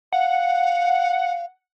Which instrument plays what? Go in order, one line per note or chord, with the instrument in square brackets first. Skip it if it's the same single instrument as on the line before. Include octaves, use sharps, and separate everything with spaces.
[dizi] F5 [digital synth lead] F#5